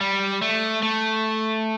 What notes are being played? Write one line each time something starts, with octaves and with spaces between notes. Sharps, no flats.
G3
A3
A3